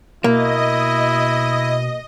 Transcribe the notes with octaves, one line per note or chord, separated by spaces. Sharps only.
B2 A#3 E4 D#5